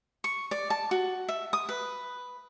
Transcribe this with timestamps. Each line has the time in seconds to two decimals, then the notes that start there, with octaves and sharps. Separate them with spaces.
0.24 C#6
0.51 D5
0.70 A5
0.91 F#4
1.28 E5
1.53 D#6
1.69 B4